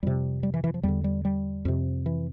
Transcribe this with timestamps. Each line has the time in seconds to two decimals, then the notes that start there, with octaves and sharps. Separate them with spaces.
0.03 F2 C3 G3
0.43 G3
0.54 E3
0.64 E3
0.74 F3
0.83 E2 D3 G3
1.04 G3
1.25 G3
1.65 F2 C3
2.06 E3